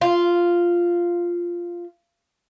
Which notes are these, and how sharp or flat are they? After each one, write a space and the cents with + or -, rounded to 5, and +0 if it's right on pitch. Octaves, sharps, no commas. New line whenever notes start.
F4 -5